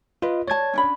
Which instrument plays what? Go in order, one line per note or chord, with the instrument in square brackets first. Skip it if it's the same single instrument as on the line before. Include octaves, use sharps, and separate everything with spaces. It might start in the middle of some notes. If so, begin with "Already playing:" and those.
[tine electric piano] F4 [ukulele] B4 D#5
[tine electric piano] C#5 G#6 [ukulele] D5 A5
[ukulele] C#4 D4 B5